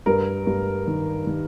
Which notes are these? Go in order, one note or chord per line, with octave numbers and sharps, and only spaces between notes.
G2 A#4
G2
D#3
D#3